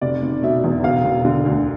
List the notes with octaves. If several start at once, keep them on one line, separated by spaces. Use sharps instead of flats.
F1 D5
F1
B2 E5
E2
E1 F5
E1
D3
D2